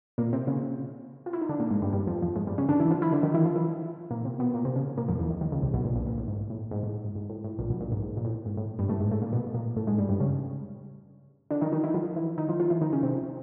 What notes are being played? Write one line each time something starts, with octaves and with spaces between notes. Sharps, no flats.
A#2 A#3
C3 C4
C#3 C#4
F4
E4
D#4
D3 D4
A#2 A#3
G#2 G#3
G2 G3
G2 G3
F2 F3
F2 F3
G#2 G#3
G2 G3
C#3 C#4
D3 D4
E3 E4
F3 F4
E3 E4
D3 D4
D#3 D#4
E3 E4
F3 F4
E3 E4
A#2 A#3
C3 C4
B2 B3
A#2 A#3
C3 C4
C#3 C#4
A#2 A#3
F2 F3
E2 E3
D#2 D#3
D#2 D#3
C#2 C#3
C2 C3
B1 B2
A#1 A#2
A#1 A#2
A#1 A#2
A2
G#2
A2
G#2
A2
G#2
G#2
A2
A2
A#1 A#2
B1 B2
A#1 A#2
G#2
G#2
A#2
A2
G#2
A2
G2 G3
A2 A3
G#2 G#3
A2 A3
A#2 A#3
B2 B3
A#2 A#3
A2 A3
G#2 G#3
G2 G3
G2 G3
C#3 C#4
D3 D4
D#3 D#4
D#3 D#4
E3 E4
F3 F4
E3 E4
D#3 D#4
F3 F4
F3 F4
E3 E4
D#3 D#4
C#3 C#4
C3 C4